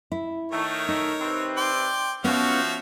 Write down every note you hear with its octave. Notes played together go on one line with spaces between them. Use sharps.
E4
D#3 A3 A#4 C#5
D#4
C3 C4 B4
D5 G5 C6
F3 B3 C#4 F#4 C#5 E5 F5